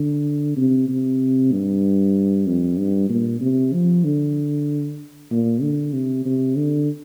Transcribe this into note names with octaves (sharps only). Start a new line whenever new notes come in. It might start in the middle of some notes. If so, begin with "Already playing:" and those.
Already playing: D3
C3
C3
G2
F2
G2
A#2
C3
F3
D3
A#2
D3
C3
C3
D3